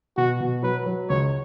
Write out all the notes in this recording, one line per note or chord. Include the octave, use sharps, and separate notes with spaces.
B2 F#4
B2
F#3 B4
F#3
C#2 C#5